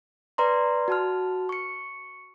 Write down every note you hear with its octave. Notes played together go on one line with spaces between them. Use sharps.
B4 D5 A#5 C6
F#4 A5 F6
C#6 C#7